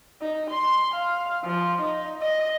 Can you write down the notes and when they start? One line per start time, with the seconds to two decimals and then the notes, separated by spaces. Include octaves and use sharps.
0.21 D#4
0.50 C6
0.94 F5
1.44 F3
1.81 D#4
2.21 D#5